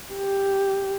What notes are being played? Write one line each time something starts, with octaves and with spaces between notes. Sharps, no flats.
G4